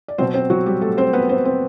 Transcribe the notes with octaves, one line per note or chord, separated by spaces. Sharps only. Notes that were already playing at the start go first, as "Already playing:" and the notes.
D5
B2 F#3 C4 C5
C4 C5
F#3 F#4
G3 G4
A3 A4
C4 C5
B3 B4
C4 C5
C4 C5